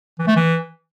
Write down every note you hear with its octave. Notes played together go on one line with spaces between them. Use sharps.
E3
A3
E3